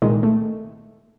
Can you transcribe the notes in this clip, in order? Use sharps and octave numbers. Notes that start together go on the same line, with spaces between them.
C2 A#2 D#3 G#3
A3